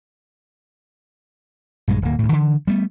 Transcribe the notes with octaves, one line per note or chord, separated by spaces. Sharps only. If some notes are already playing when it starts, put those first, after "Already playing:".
A#1 G2 F3 G#3
D1 A#3
D2 A2
D3 E3
G3 A3 B3